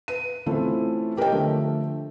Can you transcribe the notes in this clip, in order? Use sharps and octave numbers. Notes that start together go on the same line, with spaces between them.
B4 D#7
E3 A3 C4 C#4 E4 F4
G4 A#4 B4 C#5 D#5 G5
D3 F3 A3